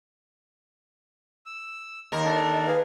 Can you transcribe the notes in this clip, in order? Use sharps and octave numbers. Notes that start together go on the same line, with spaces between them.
E6
D#2 A#4
D4 A4
G#4 B4 F5